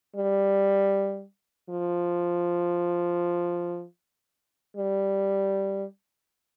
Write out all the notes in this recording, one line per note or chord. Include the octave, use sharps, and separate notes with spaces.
G3
F3
G3